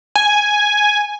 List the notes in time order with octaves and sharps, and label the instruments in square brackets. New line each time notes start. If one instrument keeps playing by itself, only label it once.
[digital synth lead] G#5